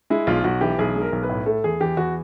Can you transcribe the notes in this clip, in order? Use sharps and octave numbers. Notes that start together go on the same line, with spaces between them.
G#3 E4
B1 F4
B1 F#4
E3 G4
B1 G#4
G#3
A#4
B1
B4
A2
A3 A4
E2 G#4
E2 G4
E2 F#4